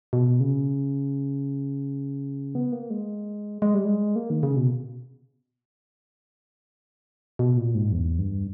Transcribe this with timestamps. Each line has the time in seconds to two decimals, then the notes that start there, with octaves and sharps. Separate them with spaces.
0.13 B2
0.40 C#3
2.55 B3
2.72 A#3
2.90 G#3
3.62 G#3
3.74 G3
3.85 G#3
4.16 A#3
4.30 D#3
4.43 C#3
4.56 B2
7.39 B2
7.57 A#2
7.75 G#2
7.92 E2
8.19 G2